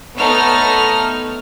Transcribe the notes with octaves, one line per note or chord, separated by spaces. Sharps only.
A3 B3 D#4 A4 C#5 F6